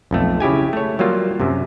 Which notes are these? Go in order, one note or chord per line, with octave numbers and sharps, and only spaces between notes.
B1 F2 A3
C#3 E4 G4 G#5
A3 C#5
F#3 G3 A#3 F4
F#2 C3